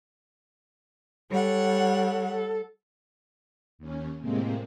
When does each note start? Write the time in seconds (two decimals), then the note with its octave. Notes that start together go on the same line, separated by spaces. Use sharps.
1.30 G3 A4 C#5 F#5
2.33 A4
3.79 D#2 C#4
4.21 A2 C3 G#3 A#3 C4